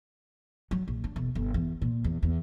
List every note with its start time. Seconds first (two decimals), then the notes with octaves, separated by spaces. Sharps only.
0.71 F#3
0.88 A#1
1.04 D4
1.16 E1
1.35 G1
1.54 E2
1.82 A#2
2.04 E2
2.22 E2